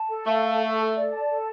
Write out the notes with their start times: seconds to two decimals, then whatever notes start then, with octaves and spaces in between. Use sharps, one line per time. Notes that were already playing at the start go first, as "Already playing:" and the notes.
Already playing: A5
0.09 A4
0.26 A3 F5
0.43 A5
0.61 A4
0.79 A4
0.95 D5
1.13 A5
1.30 A4